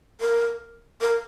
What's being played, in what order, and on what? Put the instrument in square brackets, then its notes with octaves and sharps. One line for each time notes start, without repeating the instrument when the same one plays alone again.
[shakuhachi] A#4
A#4